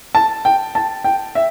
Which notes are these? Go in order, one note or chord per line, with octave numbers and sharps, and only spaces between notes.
A5
G5
A5
G5
E5